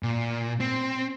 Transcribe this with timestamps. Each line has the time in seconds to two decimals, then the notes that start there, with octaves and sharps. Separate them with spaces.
0.03 A#2
0.60 C4